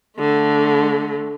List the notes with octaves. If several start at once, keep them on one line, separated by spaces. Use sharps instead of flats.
D3 A3